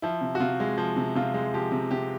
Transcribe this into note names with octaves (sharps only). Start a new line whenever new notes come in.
F3 E4
C3
F#4
C3 F4
G#3
F3
C3
C3 F4
G#3
F3 G4
C3
C3 G4